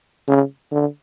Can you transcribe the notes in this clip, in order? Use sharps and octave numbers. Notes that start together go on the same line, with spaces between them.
C#3
D3